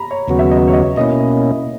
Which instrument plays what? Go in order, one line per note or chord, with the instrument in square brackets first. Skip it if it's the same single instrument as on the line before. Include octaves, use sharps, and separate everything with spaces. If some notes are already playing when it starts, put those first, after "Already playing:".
Already playing: [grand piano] A#5 B5
C#5
[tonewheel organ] D#2 C#3 F#3 B3 F#4
[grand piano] E5
D#5
C#5
D#5
[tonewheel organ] B2 A#3 C#4 E4 [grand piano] D#5